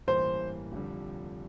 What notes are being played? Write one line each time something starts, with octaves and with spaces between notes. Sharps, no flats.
A1 G2 E3 G3 A#3 C5
F1 F2 D3 G3